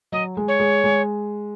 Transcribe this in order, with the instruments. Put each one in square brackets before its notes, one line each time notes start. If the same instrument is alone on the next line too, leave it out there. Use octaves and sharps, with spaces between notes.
[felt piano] F#3 [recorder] D#5
[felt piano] G#3
[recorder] C#5
[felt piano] G#3
G#3